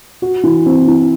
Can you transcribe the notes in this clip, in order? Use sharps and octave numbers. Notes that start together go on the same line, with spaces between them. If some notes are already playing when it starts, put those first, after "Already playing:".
F#4
E3
C4
E3